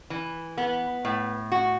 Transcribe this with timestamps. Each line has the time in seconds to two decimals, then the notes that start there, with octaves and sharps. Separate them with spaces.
0.10 E3
0.58 B3
1.05 A2
1.52 F#4